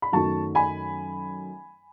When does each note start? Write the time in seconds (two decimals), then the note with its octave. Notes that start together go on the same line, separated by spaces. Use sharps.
0.02 B5
0.12 F#2 D#3 F#3 A3 A5 C#6
0.55 G#5 B5